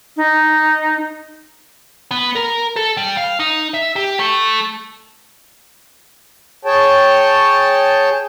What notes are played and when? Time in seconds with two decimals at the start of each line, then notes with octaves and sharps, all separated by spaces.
0.17 D#4
2.11 B3
2.36 A#4
2.76 A4
2.97 G3
3.17 F5
3.40 D#4
3.74 E5
3.96 G4
4.19 A3
6.65 G#4 C#5 G5 A5